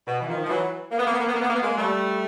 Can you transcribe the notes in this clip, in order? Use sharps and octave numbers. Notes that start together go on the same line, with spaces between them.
B2
E3
D#3 F3
F3
E3 F#3
A#3
B3
A#3
B3
A#3
B3
A#3
B3
A#3
B3
G#3 A#3
G3 A3